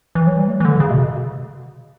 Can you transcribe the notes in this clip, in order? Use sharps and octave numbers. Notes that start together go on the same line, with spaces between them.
E3
F#3
G3
A3
E3
D3
C#3
B2